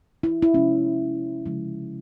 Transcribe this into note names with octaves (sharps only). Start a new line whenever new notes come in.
E4
E4
C3 F3 G#3 C#4
C#3 F3 G#3